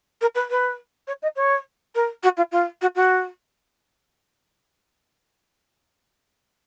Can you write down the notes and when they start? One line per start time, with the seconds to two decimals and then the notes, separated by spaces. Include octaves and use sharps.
0.21 A#4
0.35 B4
0.50 B4
1.07 C#5
1.22 D#5
1.36 C#5
1.95 A#4
2.23 F#4
2.37 F4
2.51 F4
2.81 F#4
2.95 F#4